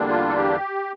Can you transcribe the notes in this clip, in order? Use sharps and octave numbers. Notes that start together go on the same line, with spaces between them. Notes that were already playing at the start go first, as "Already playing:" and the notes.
Already playing: E2 D3 G3 A#3 D4
F4
A4
G4